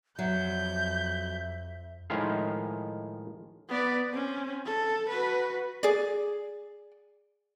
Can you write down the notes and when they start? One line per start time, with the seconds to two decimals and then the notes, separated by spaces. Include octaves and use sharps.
0.19 F2 F#3 E5 G6
2.10 A2 D#3 F3 G#3 E4 F5
3.69 B3 D5
4.09 C4 C#4
4.66 A4
5.09 F#4 B4
5.83 G#4 D5